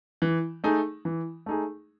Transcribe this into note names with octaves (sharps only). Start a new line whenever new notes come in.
E3
A3 D#4 G#4
E3
A3 D#4 G#4